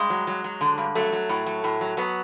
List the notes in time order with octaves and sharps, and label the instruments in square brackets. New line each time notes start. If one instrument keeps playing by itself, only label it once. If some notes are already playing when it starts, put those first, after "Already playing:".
Already playing: [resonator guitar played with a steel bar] G2 G#3
F#3
F#3
F#3
D3
G2
F#3 A3
F#3
A2
F#3
A2
F#3
F#3 B3